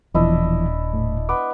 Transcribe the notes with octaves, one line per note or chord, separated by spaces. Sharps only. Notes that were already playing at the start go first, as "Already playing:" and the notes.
D#1 B2 E3 F3 D4 E4 D#5
A2
B3 D6